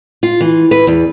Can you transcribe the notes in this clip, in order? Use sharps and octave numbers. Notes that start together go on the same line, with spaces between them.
F4
E3
B4
E2